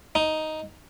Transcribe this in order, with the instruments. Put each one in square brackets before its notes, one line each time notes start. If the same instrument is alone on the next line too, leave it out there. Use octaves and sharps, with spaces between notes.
[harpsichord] D#4